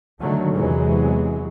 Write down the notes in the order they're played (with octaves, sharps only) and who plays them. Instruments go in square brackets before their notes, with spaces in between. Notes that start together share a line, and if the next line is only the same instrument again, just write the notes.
[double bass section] D3 D#3 F#3 A3
E2 C3 E3 F#3 G#3